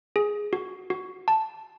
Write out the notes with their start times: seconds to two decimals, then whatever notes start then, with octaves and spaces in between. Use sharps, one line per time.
0.16 G#4
0.53 F#4
0.90 F#4
1.28 A5